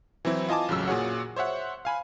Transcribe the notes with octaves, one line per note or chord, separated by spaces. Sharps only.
E3 F#3 C4 E4
F4 D#5 G#5 A5 D6
A1 F2 C#3 F#3 E6
A#2 F#4 G#4 C#5 F#5
C5 C#5 E5 F#5
F5 G#5 B5